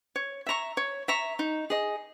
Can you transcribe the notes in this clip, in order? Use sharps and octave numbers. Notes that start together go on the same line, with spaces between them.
C#5
E5 A#5 C#6
C#5
E5 A#5 C#6
D#4
G#4 D#5